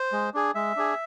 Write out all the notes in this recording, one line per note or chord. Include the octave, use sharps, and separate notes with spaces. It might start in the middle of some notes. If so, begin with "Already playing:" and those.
Already playing: C5
G#3
D4 G#4
G#3 E5
D4 G#4